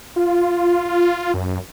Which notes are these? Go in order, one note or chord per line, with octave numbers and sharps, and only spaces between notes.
F4
F#2